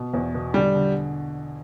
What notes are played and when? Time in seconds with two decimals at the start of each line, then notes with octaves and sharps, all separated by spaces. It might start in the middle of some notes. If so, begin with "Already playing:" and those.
Already playing: B2
0.13 E2
0.34 B2
0.54 D3 G3
0.75 D3